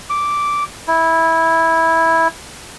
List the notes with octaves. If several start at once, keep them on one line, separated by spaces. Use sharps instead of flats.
D6
E4